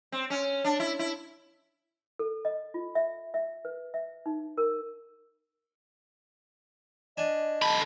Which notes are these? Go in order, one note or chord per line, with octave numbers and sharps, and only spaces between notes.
C4
C#4
D4
E4
E4
A4
D#5
F4
E5
E5
B4
E5
D#4
A#4
D4 D#5 G#5
D3 A5 B5